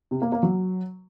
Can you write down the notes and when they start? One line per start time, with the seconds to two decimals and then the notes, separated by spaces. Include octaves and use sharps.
0.11 C3
0.22 A#3
0.32 A#3
0.43 F#3